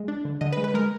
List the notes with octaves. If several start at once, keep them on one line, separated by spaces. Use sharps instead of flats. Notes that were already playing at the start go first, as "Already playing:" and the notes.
Already playing: G#3
D4
D3
D3 D#5
B4
G#3
B4
G#3 A#4